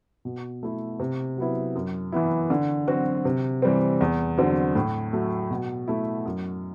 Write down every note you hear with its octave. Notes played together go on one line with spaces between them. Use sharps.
B2
A3 E4
C3
F#3 B3 E4
F#2
E3 B3 E4
D3
F#3 C4 F#4
C3
E3 G3 C4
E2
D3 F#3 C4
A2
F#3 A3
B2
A3 E4
F#2